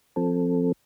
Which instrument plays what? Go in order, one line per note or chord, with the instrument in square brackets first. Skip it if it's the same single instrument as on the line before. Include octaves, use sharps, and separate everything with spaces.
[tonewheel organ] F3 C4 A4